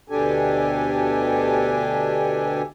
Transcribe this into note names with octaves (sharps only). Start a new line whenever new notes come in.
D2 B2 D4 G4 A4 G#5